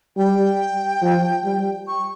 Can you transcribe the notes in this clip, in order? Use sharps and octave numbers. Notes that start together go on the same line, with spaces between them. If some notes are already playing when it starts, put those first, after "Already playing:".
G3 G5
F3
G3
C#6